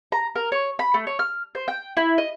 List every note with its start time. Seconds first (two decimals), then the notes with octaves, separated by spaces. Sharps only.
0.12 A#5
0.35 A#4
0.52 C#5
0.79 B5
0.94 A3
1.07 C#5
1.19 F6
1.55 C5
1.68 G5
1.97 E4
2.18 D#5